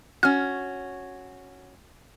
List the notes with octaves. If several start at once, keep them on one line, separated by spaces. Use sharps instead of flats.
C#4 F#4 F6